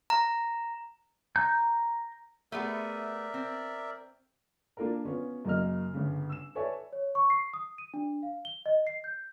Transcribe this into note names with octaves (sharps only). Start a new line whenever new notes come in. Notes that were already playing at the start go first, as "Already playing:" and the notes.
A#5
A#5 G6
A3 B3 G#4 A#4 D5 E5
C4
A#3 D4 F4 A4 A#4
B3 C#4 F4
F#2 C#3 A#3 D#5 F6
G1 C#3
E6 E7
A4 B4 C#5 D5 E5 G#5
C#5
C#6
C7
D#6
D#7
D4
F5
G7
D#5
C7
G6